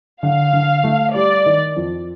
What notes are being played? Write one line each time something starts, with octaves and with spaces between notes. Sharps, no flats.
D3 F5
D3
A3
G3 D5
D#3
F2